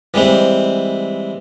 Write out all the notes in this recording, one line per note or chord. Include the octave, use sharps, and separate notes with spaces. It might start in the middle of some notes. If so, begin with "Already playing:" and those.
E3 G3 G#3 C4